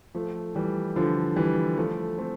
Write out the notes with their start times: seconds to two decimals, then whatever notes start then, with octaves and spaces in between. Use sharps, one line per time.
0.15 F3 A3
0.55 E3 G3
0.96 D3 F3
1.36 E3 G3
1.77 F3 A3
2.18 A3 C4